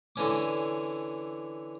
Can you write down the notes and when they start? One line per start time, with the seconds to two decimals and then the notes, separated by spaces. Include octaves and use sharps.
0.16 D3 E3 C#4 D6